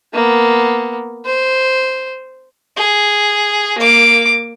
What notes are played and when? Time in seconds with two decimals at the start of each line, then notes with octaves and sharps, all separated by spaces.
0.14 A#3 B3
1.26 C5
2.77 G#4
3.78 A#3 D6